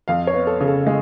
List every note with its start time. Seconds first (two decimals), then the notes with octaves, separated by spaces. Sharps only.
0.08 F2 F5
0.27 C#5
0.34 B3
0.47 A4
0.60 C#3
0.67 A4
0.87 G#3